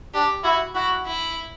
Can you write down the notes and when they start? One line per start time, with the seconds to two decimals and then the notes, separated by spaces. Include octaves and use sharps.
0.14 D4 G4
0.44 E4 F#4
0.74 E4 F#4
1.06 E4